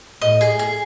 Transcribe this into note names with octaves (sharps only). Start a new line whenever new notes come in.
A2 D#5
G#4
G#4